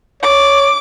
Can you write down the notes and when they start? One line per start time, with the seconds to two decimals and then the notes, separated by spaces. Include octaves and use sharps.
0.23 C#5 D6